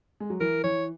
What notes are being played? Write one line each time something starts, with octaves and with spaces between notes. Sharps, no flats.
G#3
F#3
E3 A#4
E3 C#5